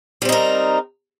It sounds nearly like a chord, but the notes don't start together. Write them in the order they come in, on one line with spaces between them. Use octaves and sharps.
G3 C4 D#4 A#4